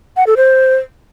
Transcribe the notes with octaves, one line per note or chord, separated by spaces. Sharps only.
F#5
A4
C5